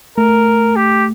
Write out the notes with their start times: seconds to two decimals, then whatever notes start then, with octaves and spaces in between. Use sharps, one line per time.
0.17 A3 A#4
0.76 G4